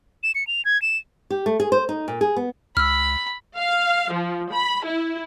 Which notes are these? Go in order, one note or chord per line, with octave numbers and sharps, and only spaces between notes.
E7
C#7
F7
G#6
E7
G4
A3
G#4
C5
D#4
A#2
G#4
B3
C#2 B5 E6 F6
F5
F3
B5
E4